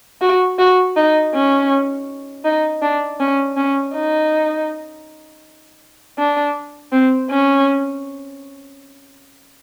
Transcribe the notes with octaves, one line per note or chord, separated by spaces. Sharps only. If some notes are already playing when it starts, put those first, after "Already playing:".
F#4
F#4
D#4
C#4
D#4
D4
C#4
C#4
D#4
D4
C4
C#4